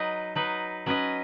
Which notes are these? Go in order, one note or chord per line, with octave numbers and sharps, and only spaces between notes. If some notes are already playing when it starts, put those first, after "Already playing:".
Already playing: F#3 D#4 B4 D#5
F#3 D#4 B4 D#5
F#3 C#4 B4 D#5